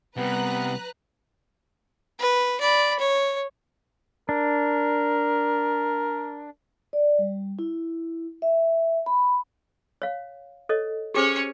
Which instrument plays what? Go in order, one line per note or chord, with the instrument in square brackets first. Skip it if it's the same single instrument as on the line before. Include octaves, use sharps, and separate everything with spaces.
[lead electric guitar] C3 G3 [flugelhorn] B3 [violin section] B4 A#5 F#6
[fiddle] B4
D5 B5
C#5
[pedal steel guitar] D4 [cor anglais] A#4
[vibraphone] D5
G3
E4
E5
B5
[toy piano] C#5 F5
A4 C#5 D#5
[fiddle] C#4 C#5 [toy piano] G4 G#4 C5